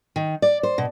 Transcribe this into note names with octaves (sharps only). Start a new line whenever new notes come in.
D#3
D5
C5
B2